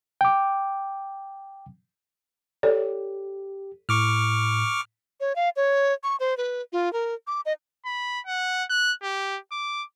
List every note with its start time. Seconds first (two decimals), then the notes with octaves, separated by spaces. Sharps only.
0.21 G5 D6
2.63 G4 A4 C#5 D5
3.89 A2 C#6 D6 F6
5.20 C#5
5.36 F5
5.56 C#5
6.03 C#6
6.20 C5
6.37 B4
6.73 F4
6.93 A#4
7.27 D6
7.46 D#5
7.86 B5
8.27 F#5
8.70 F#6
9.03 G4
9.52 D6